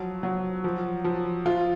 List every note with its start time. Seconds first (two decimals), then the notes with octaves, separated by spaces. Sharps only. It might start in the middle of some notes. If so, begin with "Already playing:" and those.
Already playing: F3 F#3
0.23 F#3
0.64 F3
1.04 F3
1.45 F3 F4